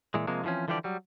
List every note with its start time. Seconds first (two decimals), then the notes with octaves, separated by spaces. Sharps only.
0.14 A#2 E3 G#3
0.27 C3 F3 G#3 A#3
0.44 D3 E3 F3 C4 C#4
0.68 D3 E3 F3 G3 G4 D5
0.84 F#3 G3